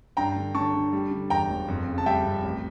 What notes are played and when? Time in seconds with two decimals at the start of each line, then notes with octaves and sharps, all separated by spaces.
0.17 G2 G5 A#5
0.36 D3
0.55 D3 A5 C#6
0.74 D3
0.93 G3
1.11 D3
1.30 E2 G5 A#5
1.50 E1
1.68 F2
1.88 C#3
1.98 A5
2.06 G3 E5 G5
2.25 F2
2.44 A1